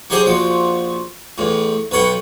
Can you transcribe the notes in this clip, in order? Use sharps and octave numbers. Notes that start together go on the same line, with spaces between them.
F#3 D#4 G4 G#4 C5
A#1 F3 F#4
E2 A2
B1 B4 C#5 F#5 G5